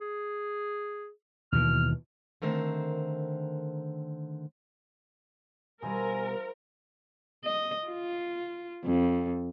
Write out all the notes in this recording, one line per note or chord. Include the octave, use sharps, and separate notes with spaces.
G#4
D#2 B2 E3 F6
D3 D#3 A3 C4 A#4 C5
B2 F3 G3 A#4 C5 E5 G#5
D#5
F4
F2